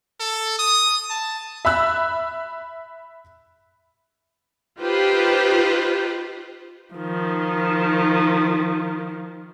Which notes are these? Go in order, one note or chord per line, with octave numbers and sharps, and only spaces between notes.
A4
D#6
A5
E5 B5 E6 F#6
D#4 F4 G4 B4 C5
D#3 F3